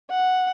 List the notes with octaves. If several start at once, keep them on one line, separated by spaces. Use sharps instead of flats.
F#5